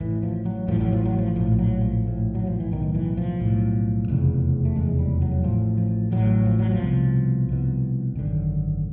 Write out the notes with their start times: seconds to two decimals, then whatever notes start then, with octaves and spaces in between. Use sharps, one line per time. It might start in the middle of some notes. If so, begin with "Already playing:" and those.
0.01 A1 A2 E3
0.23 F3
0.46 F#3
0.68 A1 A2 F3
0.80 F#3
0.93 F3
1.05 F#3
1.18 F3
1.36 A#1 A2 F3
1.59 F#3
1.81 F3
2.04 A#1 A2
2.35 F#3
2.47 F3
2.60 E3
2.71 B1 A2 D#3
2.95 E3
3.17 F3
3.40 B1 A2
4.08 F1 E2 C#3
4.65 A3
4.76 F1 E2 C#3 G#3
4.99 G3
5.22 F#3
5.44 A1 A2 F3
5.78 F3
6.12 A1 A2 F#3
6.46 F3
6.59 F#3
6.71 F3
6.80 C2 B2
7.49 C2 B2
8.15 G#1 F#2 D3